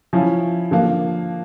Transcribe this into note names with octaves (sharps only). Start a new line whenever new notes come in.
F3 C#4 E4
D3 F3 A#3